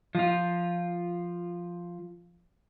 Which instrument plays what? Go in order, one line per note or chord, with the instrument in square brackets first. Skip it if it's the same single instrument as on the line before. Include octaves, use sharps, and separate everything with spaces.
[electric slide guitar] F3 F4